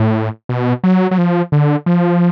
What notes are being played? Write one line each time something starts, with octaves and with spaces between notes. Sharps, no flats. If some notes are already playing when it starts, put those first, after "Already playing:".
Already playing: A2
B2
F#3
F#3
F3
D3
F3